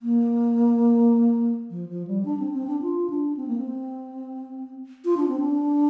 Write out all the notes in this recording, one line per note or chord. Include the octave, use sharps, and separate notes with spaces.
A#3
F3
F3
G3
D4
C4
C4
D4
F4
D4
C4
A#3
C4
F4
D4
C4
D4